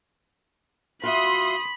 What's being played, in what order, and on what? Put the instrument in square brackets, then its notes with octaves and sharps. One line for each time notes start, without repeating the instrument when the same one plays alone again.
[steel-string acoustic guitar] F4 F#4 E5 [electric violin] B5 [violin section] C6 D#6